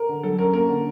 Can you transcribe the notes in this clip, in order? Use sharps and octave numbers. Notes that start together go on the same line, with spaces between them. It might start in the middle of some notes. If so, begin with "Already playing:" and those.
Already playing: A#4
D3
F#3 A4
C#4 A#4
A#3 A#4
D3